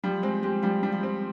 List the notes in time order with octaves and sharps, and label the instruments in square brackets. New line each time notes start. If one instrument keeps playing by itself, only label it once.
[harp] F3 [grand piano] G3
[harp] G#3 [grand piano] C4
[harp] G#3 [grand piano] G4
[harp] F3 [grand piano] G3
[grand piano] G3
[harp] F3
[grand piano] C4